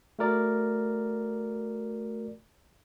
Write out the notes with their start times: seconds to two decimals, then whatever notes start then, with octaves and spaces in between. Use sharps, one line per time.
0.19 A3 F#4 A#4 D5